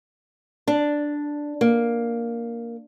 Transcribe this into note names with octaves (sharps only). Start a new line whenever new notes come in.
D4
A#3